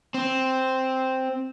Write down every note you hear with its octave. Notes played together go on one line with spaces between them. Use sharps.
C4